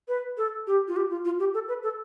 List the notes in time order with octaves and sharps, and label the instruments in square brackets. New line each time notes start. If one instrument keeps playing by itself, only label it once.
[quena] B4
A4
G4
F4
G4
F4
F4
G4
A4
B4
A4